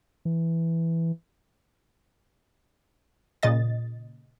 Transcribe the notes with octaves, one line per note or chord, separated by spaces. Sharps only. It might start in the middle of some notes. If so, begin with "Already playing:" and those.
E3
A#2 C#3 D#5 A6